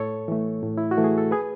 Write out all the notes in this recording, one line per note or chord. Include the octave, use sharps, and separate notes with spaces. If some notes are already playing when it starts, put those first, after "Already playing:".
Already playing: A2 A4 C#5
E3 A3
A2
E4
F#4
E3 A3
G#4
A4
G#4 B4